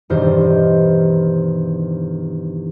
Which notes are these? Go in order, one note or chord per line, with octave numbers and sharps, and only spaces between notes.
E1 E2 G2 D#3 C5